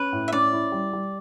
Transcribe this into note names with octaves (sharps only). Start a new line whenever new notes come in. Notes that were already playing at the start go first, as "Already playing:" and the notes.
Already playing: C#4 B4
A2
E5
C#4 D5
E4
G3
G3